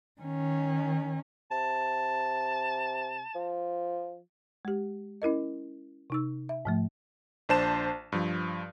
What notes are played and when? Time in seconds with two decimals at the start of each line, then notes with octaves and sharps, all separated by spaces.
0.21 D#3 C#4
1.51 C3 A5
3.35 F3
4.65 G#3 G4
5.22 C#4 E4 A#4 D#5
6.10 C3 D#4 E6
6.49 E5
6.65 G#2 F3 A3
7.49 A#1 D4 C5 A5 E7
8.12 G2 F3